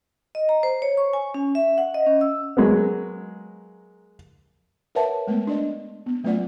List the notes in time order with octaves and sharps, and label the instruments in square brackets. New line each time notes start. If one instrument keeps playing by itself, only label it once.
[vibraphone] D#5
A#5
C5
C#5
C#6
G#5
C#4
E5
F#5
D#5
C#4
E6
[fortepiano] F#3 G#3 A#3 B3
[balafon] A#4 B4 C#5 E5 F#5 A5
G#3 A3 B3
D4 D5 D#5
B3
F#3 A3 C#4 F4 D5 F#5